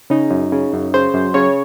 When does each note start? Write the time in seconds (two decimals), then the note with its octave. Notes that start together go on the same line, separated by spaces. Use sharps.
0.10 C#3 D#4
0.31 F#2
0.52 C#3
0.73 F#2
0.94 C#3 C5
1.14 F#2
1.34 C#3 C#5